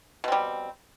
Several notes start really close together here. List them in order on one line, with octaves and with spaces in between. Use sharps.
B2 C4 G3